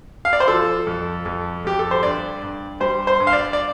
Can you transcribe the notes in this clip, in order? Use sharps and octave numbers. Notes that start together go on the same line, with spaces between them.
F5
D5
C5
F3 A4
F2
F2
F2 G4
A4
C5
G2 D5
G2
G3 C5
C5
G2
F5
D5
D5